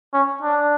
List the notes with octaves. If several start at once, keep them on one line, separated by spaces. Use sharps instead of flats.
C#4
D4